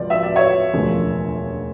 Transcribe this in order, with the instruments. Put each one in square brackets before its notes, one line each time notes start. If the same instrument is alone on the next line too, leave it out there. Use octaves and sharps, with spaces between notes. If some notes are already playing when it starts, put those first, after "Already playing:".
Already playing: [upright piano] C#2 F3 D5
E5
D5
C#5 E5
E1 D2 C#3 F3